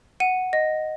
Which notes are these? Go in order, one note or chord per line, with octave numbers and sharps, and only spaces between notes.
F#5 D#7
D#5